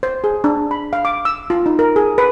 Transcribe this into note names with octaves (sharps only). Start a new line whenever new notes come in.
C5
G#4
D4
B5
F5
D6
E6
F4
D#4
A#4
G#4
B4